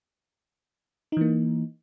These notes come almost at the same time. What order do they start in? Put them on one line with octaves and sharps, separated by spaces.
D#4 E3 A#3